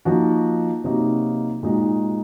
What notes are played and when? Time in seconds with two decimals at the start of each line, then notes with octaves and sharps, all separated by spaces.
0.05 F3 A#3 D#4 F#4
0.84 C3 F#3 A#3 D#4 F#4
1.63 A#2 G#3 D#4 F#4